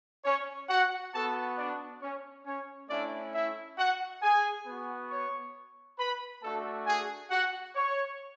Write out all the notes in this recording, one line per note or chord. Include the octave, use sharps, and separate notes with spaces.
C#4 C#5
F#4 F#5
B3 F#4 A4 A5
D4 D5
C#4 C#5
C#4 C#5
A3 C#4 D4 E4 D5
E4 E5
F#4 F#5
G#4 G#5
B3 F#4
C#5 C#6
B4 B5
A3 D4 F#4 A4 A5
G#4 G#5
F#4 F#5
C#5 C#6